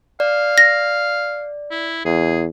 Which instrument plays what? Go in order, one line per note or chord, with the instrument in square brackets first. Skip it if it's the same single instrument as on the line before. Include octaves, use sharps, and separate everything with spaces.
[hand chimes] D5 [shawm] F5
[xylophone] A#6
[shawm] E4
[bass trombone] E2 [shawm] G#4